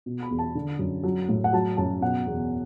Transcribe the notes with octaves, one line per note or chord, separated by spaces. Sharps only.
B2
B5
E2
A5
D3
F#2
F#3
A2
F#5
F#3 A5
F#2 A5
B2 F#5
E2